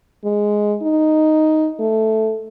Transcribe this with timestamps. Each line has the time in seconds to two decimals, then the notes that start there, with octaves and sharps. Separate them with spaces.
0.24 G#3
0.82 D#4
1.80 A3